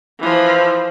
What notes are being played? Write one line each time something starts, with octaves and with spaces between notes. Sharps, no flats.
E3 F3